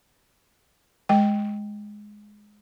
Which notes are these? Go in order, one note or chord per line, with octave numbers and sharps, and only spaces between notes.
G#3 G5